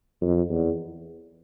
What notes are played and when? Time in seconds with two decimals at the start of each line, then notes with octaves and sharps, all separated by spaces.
0.21 F2
0.50 E2